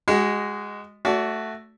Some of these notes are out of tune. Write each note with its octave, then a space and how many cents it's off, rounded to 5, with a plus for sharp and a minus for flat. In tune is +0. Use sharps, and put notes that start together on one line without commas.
G#3 -10 F#4 +20 D#5 +0
A3 +0 F#4 +0 D5 -35